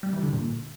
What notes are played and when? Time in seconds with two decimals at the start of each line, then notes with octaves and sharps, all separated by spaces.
0.03 G3
0.13 E3
0.23 D3
0.33 A#2